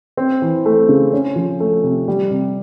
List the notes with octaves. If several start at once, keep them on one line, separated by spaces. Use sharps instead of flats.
C4
E3
A3
C#3
C#4
F3
A3
C3
G3
C3